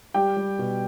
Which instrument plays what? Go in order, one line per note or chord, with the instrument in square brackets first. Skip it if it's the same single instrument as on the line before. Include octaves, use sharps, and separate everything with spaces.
[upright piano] G3 G4 G5
G3
B2